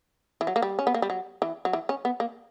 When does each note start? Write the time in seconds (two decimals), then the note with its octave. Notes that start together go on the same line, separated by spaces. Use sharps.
0.41 E3
0.47 F#3
0.56 A#3
0.62 G3
0.79 C#4
0.87 B3
0.94 A#3
1.02 G3
1.10 F#3
1.42 E3
1.65 F#3
1.73 E3
1.89 C#4
2.05 B3
2.20 A#3